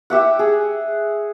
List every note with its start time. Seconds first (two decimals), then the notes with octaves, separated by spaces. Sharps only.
0.10 G4 E5 F#5
0.39 G#4